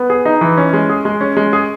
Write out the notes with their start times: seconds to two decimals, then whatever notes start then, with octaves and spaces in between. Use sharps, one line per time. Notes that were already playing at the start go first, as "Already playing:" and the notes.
Already playing: B3
0.10 G#4
0.25 D#4
0.41 E3
0.57 C#4
0.73 G#3
0.89 G#4
1.05 G#3
1.21 C#4
1.37 G#3
1.53 G#4